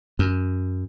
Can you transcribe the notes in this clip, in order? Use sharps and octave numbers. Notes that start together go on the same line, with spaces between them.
F#2